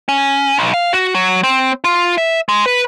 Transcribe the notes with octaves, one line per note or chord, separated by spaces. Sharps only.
C#4
B1
F5
F#4
F#3
C4
F4
E5
G#3
B4